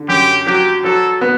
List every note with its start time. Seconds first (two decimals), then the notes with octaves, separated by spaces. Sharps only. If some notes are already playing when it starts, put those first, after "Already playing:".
Already playing: D3
0.08 F#2 G4
0.47 F#3 G4
0.84 F#3 A4
1.21 B3